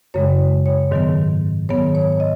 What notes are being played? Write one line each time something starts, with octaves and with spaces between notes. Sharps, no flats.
F#2 C#3 G#3 C#5
C#5
G#2 D#3 F#3 B3
G#2 D#3 F#3 B3 C#5
C#5
D#5